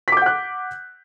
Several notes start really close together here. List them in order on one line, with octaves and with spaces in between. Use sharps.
B6 D6 G6 F#5 F#6